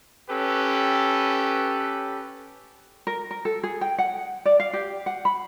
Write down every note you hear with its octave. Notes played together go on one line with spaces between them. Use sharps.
C#4 G4 A4 B4
A#4
A#4
A4
G#4
G5
F#5
D5
F5
G4
F#5
B5